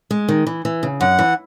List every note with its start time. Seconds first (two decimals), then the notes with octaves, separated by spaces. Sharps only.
0.11 G#3
0.29 D#3
0.47 E3
0.65 E3
0.83 C#3
1.01 F#2 F#5
1.19 E3